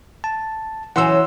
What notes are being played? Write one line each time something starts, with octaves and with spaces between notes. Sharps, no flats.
A5
C#3 E3 F#3 F#5 C6 E6